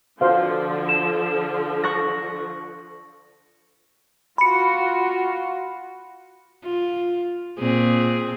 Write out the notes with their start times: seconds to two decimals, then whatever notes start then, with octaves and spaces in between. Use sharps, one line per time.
0.21 D3 F3 F#4 C5 F5
0.89 E7
1.84 C#6 F#6 A#6
4.38 F4 F#4 B5 C#7
6.64 F4
7.59 A#2 C4 G#4